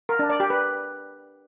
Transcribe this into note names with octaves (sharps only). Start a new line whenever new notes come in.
A#4
D4
D5
G4
B4